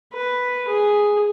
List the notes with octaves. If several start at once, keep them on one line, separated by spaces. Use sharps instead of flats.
B4
G#4